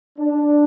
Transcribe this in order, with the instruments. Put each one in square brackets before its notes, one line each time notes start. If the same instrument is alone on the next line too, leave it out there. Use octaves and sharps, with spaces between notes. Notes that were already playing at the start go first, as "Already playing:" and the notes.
[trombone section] D4